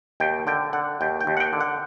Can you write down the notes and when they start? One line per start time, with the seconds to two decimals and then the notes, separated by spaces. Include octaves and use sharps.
0.20 D#2 G5
0.47 D3 G5
0.73 D3 F#5
1.01 D#2 G5
1.21 G5
1.27 D#2
1.37 F#5
1.40 G5
1.53 D3
1.61 F#5